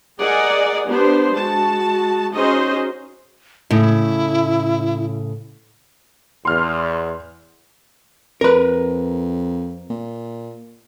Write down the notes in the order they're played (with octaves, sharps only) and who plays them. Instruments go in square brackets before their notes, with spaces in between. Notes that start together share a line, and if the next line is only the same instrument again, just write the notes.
[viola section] G#4 A#4 D5 D#5 F#5 G#5
B3 D4 G4 C5
G#3 F#4 A5
C#4 D#4 F#4 G#4 C5 D#5
[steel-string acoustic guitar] A2 C#3 [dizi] E4
[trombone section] E2 [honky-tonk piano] C6 F6
[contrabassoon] F2 [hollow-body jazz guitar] A#4 B4
[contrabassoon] A#2